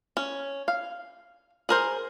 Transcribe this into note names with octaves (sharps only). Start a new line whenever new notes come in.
C#4
F5
G#4 A#4 C5